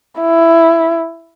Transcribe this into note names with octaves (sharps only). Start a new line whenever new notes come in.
E4